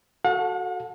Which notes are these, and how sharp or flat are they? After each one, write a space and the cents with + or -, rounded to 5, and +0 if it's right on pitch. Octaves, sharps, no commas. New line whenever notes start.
F#4 +0 A4 +0 F#5 -45